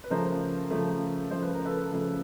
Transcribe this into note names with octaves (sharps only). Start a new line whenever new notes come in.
B4
C#3 F3 A3 A#4 C5
C#3 F3 A3
C#3 F3 A3 C5
B4
A#4
A4 B4
C#3 F3 A3